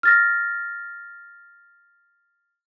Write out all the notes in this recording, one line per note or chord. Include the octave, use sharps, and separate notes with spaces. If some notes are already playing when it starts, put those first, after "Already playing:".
F6 A6 A#6